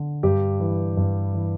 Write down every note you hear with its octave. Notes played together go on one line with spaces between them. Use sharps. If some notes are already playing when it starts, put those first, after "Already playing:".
Already playing: D3
G2 G4
E3
G2
E3